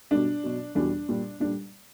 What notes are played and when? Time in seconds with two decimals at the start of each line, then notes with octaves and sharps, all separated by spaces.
0.11 B2 G3 D4
0.44 B2 F#3
0.75 E2 B2 G3 D4
1.09 A#2 G3
1.40 A#2 G3 D4